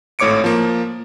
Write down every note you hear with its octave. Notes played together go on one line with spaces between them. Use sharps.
G#1 A2 C#5 D6 C#7 D7
F3 A#3